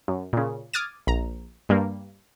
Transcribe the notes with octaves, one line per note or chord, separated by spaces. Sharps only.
F#2
A#2 C#3
D6 D#6 F6 G#6 A6 D#7
A#1 A#5
G2 G3 A#3